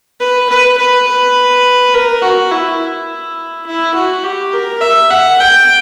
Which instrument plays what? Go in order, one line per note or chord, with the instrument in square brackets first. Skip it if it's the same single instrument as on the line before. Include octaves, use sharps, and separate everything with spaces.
[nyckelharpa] B4
B4
B4
B4
A#4
F#4
E4
E4
E4
F#4
G4
A#4
E5
F#5
G5